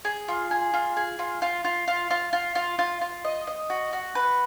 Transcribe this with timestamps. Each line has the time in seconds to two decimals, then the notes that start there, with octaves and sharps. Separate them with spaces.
0.05 G#4
0.28 F4
0.51 G#4
0.74 F4
0.97 G#4
1.19 F4
1.42 F4
1.64 F4
1.88 F4
2.10 F4
2.33 F4
2.55 F4
2.79 F4
3.01 F4
3.24 D#5
3.47 D#5
3.70 F#4
3.93 F#4
4.15 B4